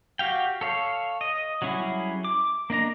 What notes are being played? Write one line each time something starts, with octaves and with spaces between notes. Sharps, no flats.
F#4 G4 F5 G5
A4 C#5 F5
D#5
F#3 G3 C#4 E4 G#4
D6
A#3 D4 D#5 A#5